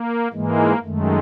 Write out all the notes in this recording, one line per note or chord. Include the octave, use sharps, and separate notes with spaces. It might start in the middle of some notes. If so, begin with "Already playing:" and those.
Already playing: A#3
G#2 E3 G#3 A#3
F#2 D#3 G#3 A3